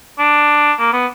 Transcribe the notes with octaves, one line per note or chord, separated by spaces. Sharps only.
D4
A#3
B3